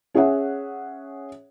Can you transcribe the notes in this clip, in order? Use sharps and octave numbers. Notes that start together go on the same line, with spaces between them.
C#4 G#4 C#5 E5 F#5